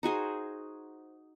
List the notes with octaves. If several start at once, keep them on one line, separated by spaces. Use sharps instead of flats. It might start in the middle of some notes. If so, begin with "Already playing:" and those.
D#4 F#4 G#4 C5